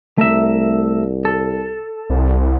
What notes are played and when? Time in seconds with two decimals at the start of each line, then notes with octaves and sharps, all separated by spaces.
0.18 C2 A3 A#4 E5
1.25 A4
2.10 C2